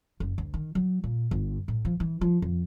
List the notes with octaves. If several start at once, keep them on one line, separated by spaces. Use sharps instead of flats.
F#1
D2
D#3
F#3
A#2
G1
A2
F3
E3
F3
F2